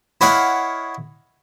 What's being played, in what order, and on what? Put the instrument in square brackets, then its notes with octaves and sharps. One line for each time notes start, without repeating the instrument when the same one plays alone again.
[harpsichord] E4 C#5 D#5 F5 F#5